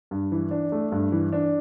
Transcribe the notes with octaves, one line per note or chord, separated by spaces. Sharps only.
G2
E3
D4
A3
G2
E3
D4